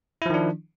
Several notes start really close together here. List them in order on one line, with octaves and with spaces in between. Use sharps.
E4 F3 D#3 D4